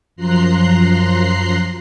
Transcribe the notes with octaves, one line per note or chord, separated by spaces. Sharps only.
F#2 F3 A#5 C6 F#6 C7